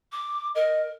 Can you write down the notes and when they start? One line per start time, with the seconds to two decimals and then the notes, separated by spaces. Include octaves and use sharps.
0.12 D6
0.55 A#4 D#5